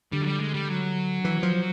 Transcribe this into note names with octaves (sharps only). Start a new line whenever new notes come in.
D3 G3
F#3
G3
G#3
G3
F#3
E3
F3